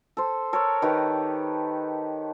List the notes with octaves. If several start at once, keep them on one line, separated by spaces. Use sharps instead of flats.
A4 C5
A4 A#4 C#5
D#3 G4 B4